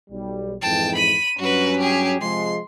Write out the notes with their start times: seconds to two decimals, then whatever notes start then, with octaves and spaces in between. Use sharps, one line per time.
0.10 B1 G3
0.62 F2 G#2 E3 G5 A5
0.96 B5 D#7
1.39 G2 F#3 C#4 F#4 B4
1.80 G4 G#4
2.21 C3 F3 G#3 C6